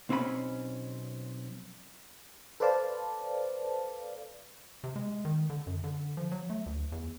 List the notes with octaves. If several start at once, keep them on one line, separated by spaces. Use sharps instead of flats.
B1 C4 C#4 E4 B5
A4 B4 C5 D5 F5 A5
C3
G#3
D#3
D3
F#2
D3
F3
F#3
A3
D2
E2